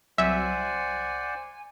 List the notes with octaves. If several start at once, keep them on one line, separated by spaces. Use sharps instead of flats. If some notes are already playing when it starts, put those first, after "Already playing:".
C2 F#3 C5 D5 E5 F#5 G#5